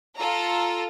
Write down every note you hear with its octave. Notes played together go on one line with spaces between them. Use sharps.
F4 A4 A#5